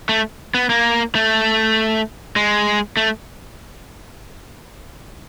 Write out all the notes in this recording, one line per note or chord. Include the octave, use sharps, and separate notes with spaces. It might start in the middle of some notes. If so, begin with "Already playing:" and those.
A3
B3
A#3
A3
G#3
A3